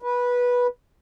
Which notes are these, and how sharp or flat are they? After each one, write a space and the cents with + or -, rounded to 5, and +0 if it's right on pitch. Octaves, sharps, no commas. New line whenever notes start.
B4 -15